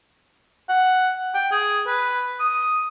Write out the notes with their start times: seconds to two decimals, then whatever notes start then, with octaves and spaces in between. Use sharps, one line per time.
0.69 F#5
1.34 G5
1.51 G#4
1.87 B4
2.40 D#6